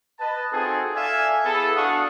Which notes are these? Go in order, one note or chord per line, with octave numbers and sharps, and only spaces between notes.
B4 D#5 A5
C4 D#4 F4 F#4 G#4 A4
A4 D5 E5 F5 G#5
B3 E4 G#4 A4
D4 F#4 F5 F#5 C#6 D#6